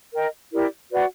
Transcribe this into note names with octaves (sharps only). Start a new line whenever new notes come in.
A#4 D#5 G5
E4 G4 A#4 D5
F#4 B4 D5 F#5